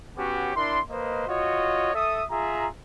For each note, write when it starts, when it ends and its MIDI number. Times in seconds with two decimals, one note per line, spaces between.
0.17 0.50 59
0.17 0.50 61
0.17 0.50 66
0.17 0.50 67
0.17 0.50 73
0.55 0.79 62
0.55 0.79 64
0.55 0.79 70
0.55 0.79 84
0.89 1.26 58
0.89 1.26 71
0.89 1.26 72
0.89 1.26 75
1.27 1.93 65
1.27 1.93 66
1.27 1.93 73
1.27 1.93 75
1.94 2.23 69
1.94 2.23 76
1.94 2.23 87
2.30 2.67 65
2.30 2.67 68
2.30 2.67 76
2.30 2.67 82